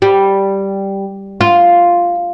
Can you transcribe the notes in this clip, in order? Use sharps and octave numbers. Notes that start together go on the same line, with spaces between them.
G3
F4